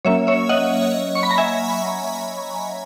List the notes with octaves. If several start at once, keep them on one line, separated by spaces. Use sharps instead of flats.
F#3 A#3 C#4 C#5 E5
C#5 E5
D#5 F#5
C#6
B5
A#5
E5 G#5